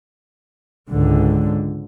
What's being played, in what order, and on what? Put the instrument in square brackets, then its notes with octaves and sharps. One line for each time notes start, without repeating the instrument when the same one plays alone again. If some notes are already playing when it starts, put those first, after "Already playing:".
[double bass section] C#2 G#2 D3